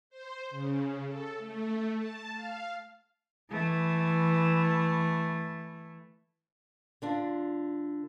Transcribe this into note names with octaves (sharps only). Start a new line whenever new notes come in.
C5
C#3
A4
A3
A5
F5
E3 A3
D3 D4 F4